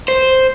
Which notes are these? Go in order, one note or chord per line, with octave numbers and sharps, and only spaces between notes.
C5